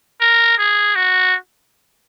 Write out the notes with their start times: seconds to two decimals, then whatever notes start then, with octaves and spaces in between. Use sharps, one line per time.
0.21 A#4
0.58 G#4
0.95 F#4